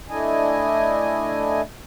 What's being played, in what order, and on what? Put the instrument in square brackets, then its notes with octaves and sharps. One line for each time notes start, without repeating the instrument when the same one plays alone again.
[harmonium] A3 D4 E4 D#5 G#5